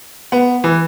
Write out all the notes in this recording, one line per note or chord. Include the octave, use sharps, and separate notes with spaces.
B3
E3